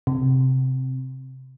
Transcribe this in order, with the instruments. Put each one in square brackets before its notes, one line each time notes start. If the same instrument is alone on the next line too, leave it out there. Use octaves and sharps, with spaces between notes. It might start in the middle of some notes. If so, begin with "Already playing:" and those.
[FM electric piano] C3